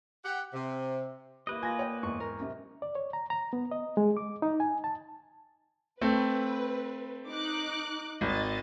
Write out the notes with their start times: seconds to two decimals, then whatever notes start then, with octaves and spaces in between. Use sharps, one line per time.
0.24 G4 F#5
0.53 C3
1.47 A#3 E4 G4 B4 D#5
1.63 F4 G#5 A#6
1.79 C#5 G5
2.03 E2 G#2 C#6
2.20 A#4
2.39 F#2 C3
2.82 D5
2.95 C#5
3.13 A#5
3.30 A#5
3.53 B3
3.71 D#5
3.97 G#3
4.17 D6
4.42 D#4
4.60 G#5
4.84 A5
6.01 A3 C4 B4
7.28 D#4 D6 F#6
8.21 G#1 D#5 A6